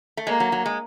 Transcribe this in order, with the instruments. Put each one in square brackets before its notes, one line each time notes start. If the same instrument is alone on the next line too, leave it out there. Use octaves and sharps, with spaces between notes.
[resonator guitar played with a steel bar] A3
[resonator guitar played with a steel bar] G#3 [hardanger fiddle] A#3
[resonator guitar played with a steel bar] F#3
F#3
G#3